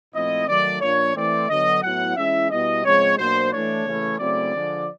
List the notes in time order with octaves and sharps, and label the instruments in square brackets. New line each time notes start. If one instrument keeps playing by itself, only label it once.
[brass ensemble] A#2 F3 A3 C4 E4 D#5
D#3 F#3 A3 D5
A#2 F3 A#3 D4 C#5
E3 A3 C4 D5
D3 F#3 B3 D#5
A2 F#3 B3 E4 F#5
E3 G#3 C#4 E4 E5
B2 G3 B3 E4 D#5
C#3 F3 G#3 C4 C#5
B2 F#3 A#3 D4 C5
E3 A3 D4 C#5
C#3 E3 A3 C#4 E4
C#3 F#3 A3 C4 E4 D5
D3 F3 G#3